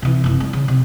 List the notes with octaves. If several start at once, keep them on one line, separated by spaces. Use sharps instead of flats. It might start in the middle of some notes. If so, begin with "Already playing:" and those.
C3 E3
F#1 C4
G3
C#3
C3